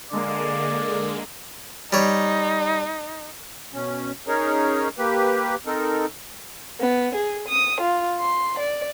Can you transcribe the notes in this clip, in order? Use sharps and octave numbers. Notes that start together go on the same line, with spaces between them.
D3 G#3 A#3 D5
G3 D#4 C#5
B2 C#4
C#4 D#4 G#4 A#4 C#5
A#3 G4 B4
C4 D#4 A4 A#4
B3
G#4
D#6
F4
C6
D5